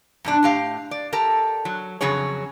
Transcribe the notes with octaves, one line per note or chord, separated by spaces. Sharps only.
F#2 B2 D4
A2 G4 F5
D5
G4 A4 A#4
F#3
F2 C#3 F#3 C#4 G#4 C#5